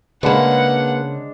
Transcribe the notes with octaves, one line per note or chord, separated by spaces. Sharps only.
C#3 G#3 A#3 D4 B4 F#5 A#5